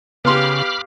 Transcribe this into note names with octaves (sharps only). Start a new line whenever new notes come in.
C#3 B3 G4 F5 B5 C6 D6 F6